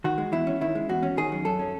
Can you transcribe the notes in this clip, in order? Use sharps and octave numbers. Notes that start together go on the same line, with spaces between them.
D#3 F#4
G#3
E2 E4
C#4
D#3 E4
G#3
E2 F#4
C#4
D#3 G#4
F#3
F#2 A4
C#4